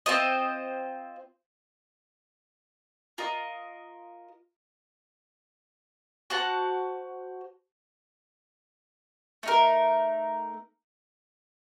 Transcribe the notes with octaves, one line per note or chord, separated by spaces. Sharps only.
C4 F4 C5 D#5
F4 A#4 D#5
F#4 C5 F#5 A5
A3 D#4 A#4